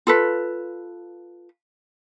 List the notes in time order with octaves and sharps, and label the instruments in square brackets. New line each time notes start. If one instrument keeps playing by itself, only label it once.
[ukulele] F4 A4 B4